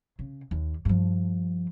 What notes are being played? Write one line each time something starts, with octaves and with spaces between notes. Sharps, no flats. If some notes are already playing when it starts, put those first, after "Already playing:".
C#3
D#2
G2 F3